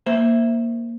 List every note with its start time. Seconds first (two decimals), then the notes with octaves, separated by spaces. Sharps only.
0.06 A#3 C5 E5